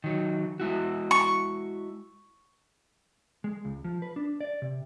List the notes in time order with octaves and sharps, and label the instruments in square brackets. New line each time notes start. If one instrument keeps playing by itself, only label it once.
[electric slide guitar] D#3 F#3
G#3 E4 F#4
[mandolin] C#6
[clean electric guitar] G#3
C#2
F3
B4
D4
D5
C3